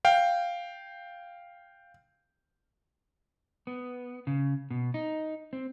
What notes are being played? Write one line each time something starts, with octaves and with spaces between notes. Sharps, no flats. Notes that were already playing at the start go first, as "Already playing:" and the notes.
F5 G5
B3
C#3
B2
D#4
C4